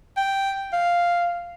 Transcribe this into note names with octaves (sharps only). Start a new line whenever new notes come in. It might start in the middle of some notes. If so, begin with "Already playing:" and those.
G5
F5